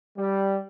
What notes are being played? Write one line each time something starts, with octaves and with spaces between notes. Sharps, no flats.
G3